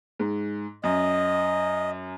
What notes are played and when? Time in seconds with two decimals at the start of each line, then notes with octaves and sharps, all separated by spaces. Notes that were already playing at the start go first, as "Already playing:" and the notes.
0.20 G#2
0.84 F#2 D#5